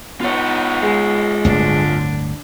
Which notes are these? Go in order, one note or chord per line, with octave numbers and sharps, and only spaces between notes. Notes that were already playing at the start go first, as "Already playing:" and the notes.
B3 D#4 F4 C#5
G#3
D1 G1 D2 D3 D4